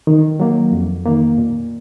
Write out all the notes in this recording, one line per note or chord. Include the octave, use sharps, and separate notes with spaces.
D#3
F#3 A#3
F2
D#3 A#3
A#2